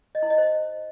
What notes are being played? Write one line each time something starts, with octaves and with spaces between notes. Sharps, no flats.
D#5
E4
D#5
C5